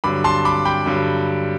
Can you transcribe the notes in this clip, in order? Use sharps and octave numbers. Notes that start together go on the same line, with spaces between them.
G2 D3 F#3 B5 D6
A5 C6
B5 D6
G5 B5
G2 D3 F#3